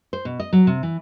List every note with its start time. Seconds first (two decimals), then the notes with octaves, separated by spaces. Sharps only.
0.13 C5
0.25 B2
0.40 D#5
0.53 F#3
0.67 C3
0.83 E3